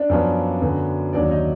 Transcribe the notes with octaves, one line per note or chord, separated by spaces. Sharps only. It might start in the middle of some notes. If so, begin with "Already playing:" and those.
Already playing: D4 D5
F#2 F3 B3
F#2 D3 F#3 B3
D#2 D#3 F#3 A#3 D4 D5
D#4 D#5